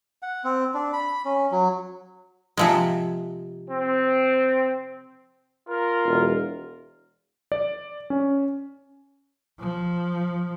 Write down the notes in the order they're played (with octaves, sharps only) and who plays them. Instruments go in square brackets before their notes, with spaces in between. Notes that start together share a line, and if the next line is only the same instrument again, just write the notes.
[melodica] F#5
C4
D4
B5
C#4
F#3
[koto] C3 F3 G#3
[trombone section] C4
[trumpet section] F4 A#4
[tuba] E1
[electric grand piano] D5
C#4
[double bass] F3